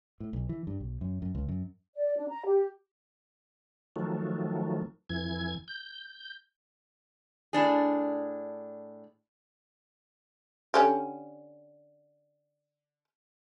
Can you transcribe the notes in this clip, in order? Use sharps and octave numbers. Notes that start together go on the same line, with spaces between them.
A2
B1
E3
G2
B1
F#2
F#2
C#2
F#2
D5
D4
A#5
G4
D#3 F3 F#3 A3
F2 E3 G#6
G6
A2 D4 G#4
D3 C#4 G4